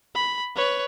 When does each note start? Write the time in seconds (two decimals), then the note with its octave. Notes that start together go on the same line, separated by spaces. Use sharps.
0.15 B5
0.56 B4 C#5